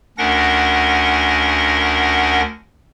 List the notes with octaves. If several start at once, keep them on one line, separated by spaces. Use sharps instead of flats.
D2 C#4 D4 A#4 F#5 A#6